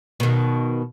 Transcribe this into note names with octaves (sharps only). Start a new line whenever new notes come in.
B2 D#3